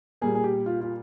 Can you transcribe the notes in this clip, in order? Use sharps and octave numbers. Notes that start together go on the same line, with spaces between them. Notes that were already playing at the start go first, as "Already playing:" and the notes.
A#2 G3 A#3 G#4
G#4
G4
F4
F4